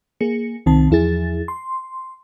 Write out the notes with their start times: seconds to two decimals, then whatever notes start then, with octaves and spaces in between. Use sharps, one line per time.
0.21 A#3 G#4 C#7
0.66 C2 D#3 C4 A5
0.90 E2 F3 E4 G#4 A6
1.48 C6